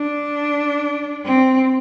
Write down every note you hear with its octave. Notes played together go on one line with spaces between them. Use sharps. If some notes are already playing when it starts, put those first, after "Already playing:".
Already playing: D4
C4